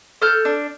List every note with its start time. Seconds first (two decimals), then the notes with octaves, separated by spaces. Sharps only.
0.22 A4 F6 G6
0.45 D4